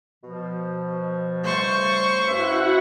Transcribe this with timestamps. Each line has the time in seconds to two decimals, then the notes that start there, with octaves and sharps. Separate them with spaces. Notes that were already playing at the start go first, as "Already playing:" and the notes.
0.24 B2 F3
1.44 C#3 G3 A3 C5 C#6
2.27 G2 C#4 E4 F#4 E5 F#5